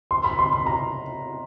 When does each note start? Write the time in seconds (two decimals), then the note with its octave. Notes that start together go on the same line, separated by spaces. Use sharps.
0.11 C6
0.24 B5
0.39 C6
0.52 B5
0.66 A#5